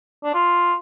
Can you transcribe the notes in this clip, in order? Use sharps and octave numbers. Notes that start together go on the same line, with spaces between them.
D4
F4